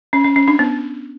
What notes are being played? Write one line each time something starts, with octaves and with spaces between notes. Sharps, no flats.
C#4
C#4
C#4
D4
B3